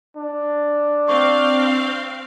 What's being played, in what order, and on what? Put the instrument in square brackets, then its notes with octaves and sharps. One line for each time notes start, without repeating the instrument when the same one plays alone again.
[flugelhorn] D4
[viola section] C4 F5 [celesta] C#6